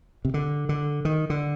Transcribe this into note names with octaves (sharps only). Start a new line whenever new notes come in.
C3
D3
D3
D#3
D3